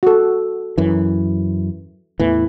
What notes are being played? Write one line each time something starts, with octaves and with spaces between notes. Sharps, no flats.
F#4 A4
F#2 E3
E2 A2 E3